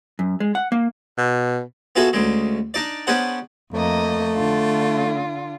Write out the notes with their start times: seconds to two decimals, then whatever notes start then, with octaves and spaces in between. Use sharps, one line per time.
0.19 F#2
0.40 G#3
0.55 F#5
0.72 A#3
1.18 B2
1.96 B3 F4 F#4 G#4 A4 E5
2.13 D2 C#3 G#3
2.74 D4 D#4 D5
3.07 B3 C#4 D4 G#4 C5 F#5
3.74 F2 A3 A#3 D#5
4.35 D3 F4